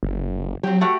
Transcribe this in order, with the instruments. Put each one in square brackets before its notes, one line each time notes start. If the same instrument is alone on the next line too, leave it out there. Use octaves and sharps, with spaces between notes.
[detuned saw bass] F#1
[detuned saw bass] F#3 [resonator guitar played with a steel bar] C4 G4
[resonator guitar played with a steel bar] A3 F#4 G4